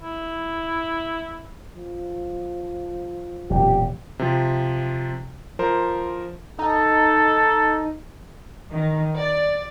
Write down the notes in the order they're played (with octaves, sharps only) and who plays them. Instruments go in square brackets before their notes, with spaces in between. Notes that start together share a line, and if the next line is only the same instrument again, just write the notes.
[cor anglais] E4
[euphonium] F3
[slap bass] E1 [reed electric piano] F#2 A#2 [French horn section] G4
[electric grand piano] C3 F3
F3 A#4 C5
[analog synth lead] D#4 [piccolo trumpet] A4
[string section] D#3
D5